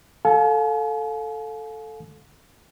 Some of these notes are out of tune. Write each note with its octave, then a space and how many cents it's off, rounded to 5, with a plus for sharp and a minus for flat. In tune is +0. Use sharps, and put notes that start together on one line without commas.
A4 +0 F5 +25 G#5 +40